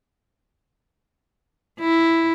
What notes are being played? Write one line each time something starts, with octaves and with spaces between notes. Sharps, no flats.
E4